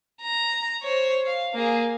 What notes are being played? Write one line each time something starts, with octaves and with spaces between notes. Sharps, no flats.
A#5
C5 C#5
F5
A#3 G#4